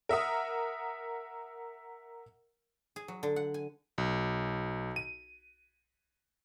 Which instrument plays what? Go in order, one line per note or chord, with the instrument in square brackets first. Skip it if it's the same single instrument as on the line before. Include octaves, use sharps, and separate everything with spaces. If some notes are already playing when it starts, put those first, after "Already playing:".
[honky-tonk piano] A#4 E5 F#5 D#6
[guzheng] G#4
F#3
D3
F#5
G#5
[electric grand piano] B1
D#7